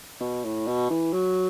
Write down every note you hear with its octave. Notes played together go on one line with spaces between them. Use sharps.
B2
A2
B2
E3
F#3